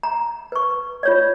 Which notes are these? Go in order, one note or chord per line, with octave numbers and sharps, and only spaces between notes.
A#5
B4 C#6
F4 C#5 D5